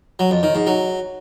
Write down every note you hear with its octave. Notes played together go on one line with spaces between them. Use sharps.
F#3
F2
D#3
G#2
F#3